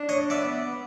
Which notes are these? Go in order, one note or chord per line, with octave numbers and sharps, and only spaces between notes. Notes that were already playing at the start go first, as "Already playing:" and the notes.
Already playing: D4
C#5 D#5
B3 D5 E5